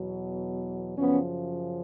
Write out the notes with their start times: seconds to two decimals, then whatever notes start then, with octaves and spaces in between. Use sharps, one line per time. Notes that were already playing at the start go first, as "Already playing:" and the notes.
Already playing: E2 B2 F#3
0.98 F#2 C#3 F3 B3 C#4